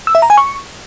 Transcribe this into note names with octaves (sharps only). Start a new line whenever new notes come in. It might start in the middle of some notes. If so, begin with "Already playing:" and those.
E6
E5
A#5
G#5
C#6